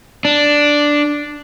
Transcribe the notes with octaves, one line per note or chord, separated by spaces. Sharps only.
D4